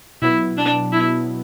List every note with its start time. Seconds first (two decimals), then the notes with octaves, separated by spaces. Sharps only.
0.22 B2 F#3 B3 E4
0.58 D4
0.92 E4